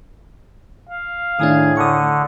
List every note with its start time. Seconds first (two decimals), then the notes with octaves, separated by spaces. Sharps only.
0.89 F5
1.39 A2 D#3 A3 D4 G#4
1.77 D3 C#6 D#6